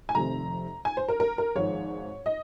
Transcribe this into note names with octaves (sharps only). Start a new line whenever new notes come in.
G#5
F1 F2 C3 D#3 A#5
G#5
C5
A#4
A#4
A#4
G#1 G#2 F3 C#5
D#5